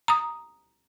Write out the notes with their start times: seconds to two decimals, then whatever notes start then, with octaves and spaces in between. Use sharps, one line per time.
0.08 A#5 D#6